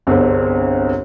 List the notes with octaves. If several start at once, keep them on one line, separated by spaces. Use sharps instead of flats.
G1 C2 G#3 B3 C4 D4